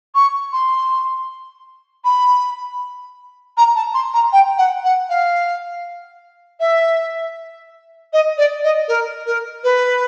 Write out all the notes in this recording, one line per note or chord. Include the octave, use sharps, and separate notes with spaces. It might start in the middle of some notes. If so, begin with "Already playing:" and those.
C#6
C6
B5
A#5
A5
C6
A#5
G5
F#5
F#5
F5
E5
D#5
D5
D#5
A#4
A#4
B4